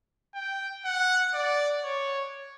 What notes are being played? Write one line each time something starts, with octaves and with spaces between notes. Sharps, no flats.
G5
F#5
D5
C#5